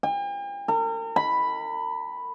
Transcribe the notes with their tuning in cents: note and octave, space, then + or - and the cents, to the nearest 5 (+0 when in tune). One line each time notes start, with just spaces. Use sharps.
G5 +45
A#4 -40
B5 +0